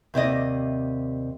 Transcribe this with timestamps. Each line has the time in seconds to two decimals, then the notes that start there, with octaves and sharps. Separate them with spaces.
0.14 D#2 C3 D5 D#5